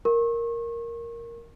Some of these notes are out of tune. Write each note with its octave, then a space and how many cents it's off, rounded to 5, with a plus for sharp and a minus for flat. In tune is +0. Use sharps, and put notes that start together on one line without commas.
A#4 +0 C#6 -35